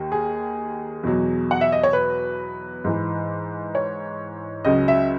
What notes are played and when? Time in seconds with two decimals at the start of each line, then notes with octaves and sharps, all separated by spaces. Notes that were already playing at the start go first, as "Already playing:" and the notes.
Already playing: D#2 D#3
0.12 G#4
1.03 E2 B2 F#3
1.51 F#5
1.61 E5
1.72 D#5
1.83 C#5
1.93 B4
2.84 G#2 E3
3.75 C#5
4.65 C#2 C#3 F#3 D#5
4.88 E5